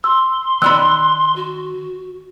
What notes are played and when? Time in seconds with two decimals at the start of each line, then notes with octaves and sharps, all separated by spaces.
0.04 C6 E6
0.62 D#3 D5 B5 E6 F#6
1.36 F#4